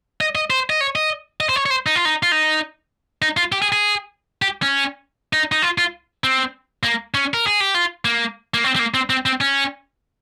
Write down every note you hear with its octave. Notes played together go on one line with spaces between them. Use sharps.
D#5
D#5
C5
D#5
C#5
D#5
D#5
C5
C#5
C#5
C5
D#4
F4
D#4
F4
D#4
D#4
F4
G4
G#4
G#4
G4
C#4
D#4
D#4
F4
F4
C4
A#3
C#4
A#4
G#4
G4
F4
A#3
A#3
C4
C4
A#3
C4
C4
C4
C#4